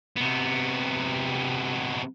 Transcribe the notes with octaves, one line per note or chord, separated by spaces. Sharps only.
C3 B3